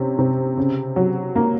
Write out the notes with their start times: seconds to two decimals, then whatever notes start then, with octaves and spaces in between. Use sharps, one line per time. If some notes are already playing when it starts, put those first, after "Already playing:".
Already playing: C3 C#4
0.19 C3
0.58 C#3
0.96 F#3
1.35 A#3